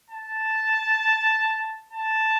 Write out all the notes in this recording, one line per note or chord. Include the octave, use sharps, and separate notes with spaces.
A5
A5